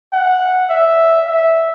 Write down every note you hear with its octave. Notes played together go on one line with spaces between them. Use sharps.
F#5
E5
E5